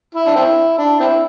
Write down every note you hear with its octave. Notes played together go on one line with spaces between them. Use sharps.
E4
D4
C4 E4
D4
C4 E4